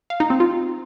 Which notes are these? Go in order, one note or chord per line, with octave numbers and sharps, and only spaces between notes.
F5
D#4
C4
F4